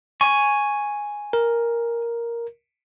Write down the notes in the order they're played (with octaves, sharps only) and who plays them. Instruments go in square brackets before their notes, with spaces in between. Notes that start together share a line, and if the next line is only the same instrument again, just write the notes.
[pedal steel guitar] G#5 C#6
[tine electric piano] A#4